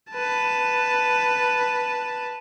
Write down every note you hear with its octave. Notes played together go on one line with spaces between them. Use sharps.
B4 A5